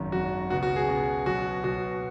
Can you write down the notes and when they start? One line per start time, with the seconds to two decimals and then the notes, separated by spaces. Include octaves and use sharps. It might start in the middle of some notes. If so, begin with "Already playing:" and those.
Already playing: G#1 F#2 D#3
0.12 G#1 F#2 D#3 F#4
0.50 C#2 B2 F#4
0.63 F#4
0.76 G#4
0.88 C#2 B2
1.26 B1 B2 F#4
1.64 B1 B2 F#4